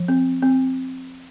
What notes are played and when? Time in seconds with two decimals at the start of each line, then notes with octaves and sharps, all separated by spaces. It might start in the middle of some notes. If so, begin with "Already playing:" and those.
Already playing: F3
0.08 C4
0.42 C4